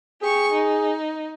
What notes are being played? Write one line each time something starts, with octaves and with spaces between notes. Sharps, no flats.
G4 G#4 C#6
D#4